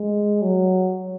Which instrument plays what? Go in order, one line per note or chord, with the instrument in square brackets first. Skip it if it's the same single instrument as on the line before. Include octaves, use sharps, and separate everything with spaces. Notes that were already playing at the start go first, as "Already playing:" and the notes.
Already playing: [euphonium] G#3
F#3